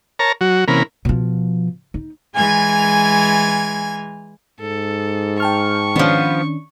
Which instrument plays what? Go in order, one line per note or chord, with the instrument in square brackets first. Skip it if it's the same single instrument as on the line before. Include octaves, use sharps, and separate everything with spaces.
[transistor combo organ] A#4 C#5 A5 A#5
F#3 F#4
C3 E3 A#3 C#4 A#4 B5
[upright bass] B2 F3
D#4
[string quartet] E3 G#3 G#5 F6 G#6
[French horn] G#2 [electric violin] A4
[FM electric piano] G5 A5 F6 [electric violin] C#6
[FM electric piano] D#3 C#4 D4 [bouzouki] F3 B3